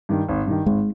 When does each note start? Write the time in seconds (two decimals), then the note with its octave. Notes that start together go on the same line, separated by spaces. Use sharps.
0.09 G2 D#3
0.29 G#1
0.47 G2 D#3
0.66 G#1 G#3